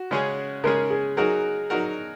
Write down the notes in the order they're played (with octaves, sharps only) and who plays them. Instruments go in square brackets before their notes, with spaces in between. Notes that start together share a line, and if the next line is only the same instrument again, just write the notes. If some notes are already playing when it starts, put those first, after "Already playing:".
Already playing: [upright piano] F#4
[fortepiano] C#3 G#3 C#4 G#4
[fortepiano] C#3 G#3 C#4 G#4 [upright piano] A#4
[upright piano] G#4
[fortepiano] F#3 D#4 F#4 A#4 [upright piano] G#4
[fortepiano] F#3 D#4 F#4 A#4